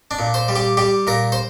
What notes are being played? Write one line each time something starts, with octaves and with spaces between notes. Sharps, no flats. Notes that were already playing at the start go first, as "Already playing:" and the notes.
D4
A#2
C5
G3
G4
G3 G4
A#2 A#4
C5